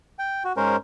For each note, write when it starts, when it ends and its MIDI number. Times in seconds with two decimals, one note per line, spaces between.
0.19 0.43 79
0.45 0.52 66
0.57 0.76 44
0.57 0.76 56
0.57 0.76 61
0.57 0.76 70
0.57 0.76 72